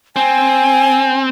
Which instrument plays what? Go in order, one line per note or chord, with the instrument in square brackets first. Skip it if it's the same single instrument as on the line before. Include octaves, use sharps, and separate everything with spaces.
[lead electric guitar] C4 [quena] G#5